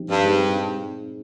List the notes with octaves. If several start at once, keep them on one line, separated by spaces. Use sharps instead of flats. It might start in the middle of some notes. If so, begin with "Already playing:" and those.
Already playing: F3 C4 D#4 G4
G2
G#3 C4 D#4 G#4